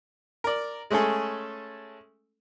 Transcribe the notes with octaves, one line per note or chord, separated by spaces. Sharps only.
A#4 D5
G#3 A3 C#4 G#4 A4